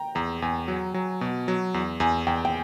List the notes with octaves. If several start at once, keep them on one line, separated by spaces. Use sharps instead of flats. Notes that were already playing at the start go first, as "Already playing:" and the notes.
Already playing: G5 A#5
E2 A#5
E2 G#5
F#3
F#3
B2
F#3
E2
E2 G#5
E2 G5
G5